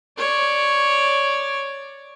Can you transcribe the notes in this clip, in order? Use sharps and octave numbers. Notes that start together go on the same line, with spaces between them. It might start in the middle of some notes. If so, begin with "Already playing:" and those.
C#5 D5